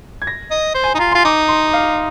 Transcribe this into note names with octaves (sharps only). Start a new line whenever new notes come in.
G#6
A#6
D#5
C5
G#5
D#4 F4 A#5
F4 C6
D#4 D6
C6
F5